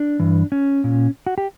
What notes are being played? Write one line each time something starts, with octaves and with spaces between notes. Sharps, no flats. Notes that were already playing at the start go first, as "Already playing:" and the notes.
Already playing: D4
G2 E3
C#4
A#2
F#4
G4